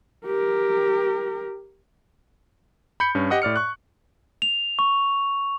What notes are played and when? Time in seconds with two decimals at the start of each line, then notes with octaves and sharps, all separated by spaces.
0.26 G4 A#4
3.00 B5 G6 C#7
3.15 G2 C#4
3.30 G4 D#5 F#5 D#6
3.42 A2 D5 F6 C#7
3.56 C#6 F#6
4.42 F7
4.79 C#6